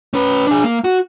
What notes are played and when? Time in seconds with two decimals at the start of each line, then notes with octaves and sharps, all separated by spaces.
0.14 C#4 B4
0.47 D4 G#4
0.64 A#3
0.84 F#4